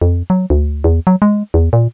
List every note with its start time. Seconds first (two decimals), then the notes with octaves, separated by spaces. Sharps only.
0.02 F2
0.30 F#3
0.50 D2
0.84 E2
1.07 F#3
1.22 G#3
1.54 E2
1.73 A#2